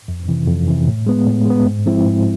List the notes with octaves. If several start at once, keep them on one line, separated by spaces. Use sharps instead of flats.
F2
C3 E3
F2
C3 E3
A2
G#3 B3
A2
G#3 B3
G#2
F3 G#3 C4 E4
G#2